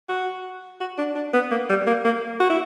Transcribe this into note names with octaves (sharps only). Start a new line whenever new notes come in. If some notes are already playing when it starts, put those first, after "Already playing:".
F#4
F#4
D4
D4
B3
A#3
G3
A#3
A#3
F#4
E4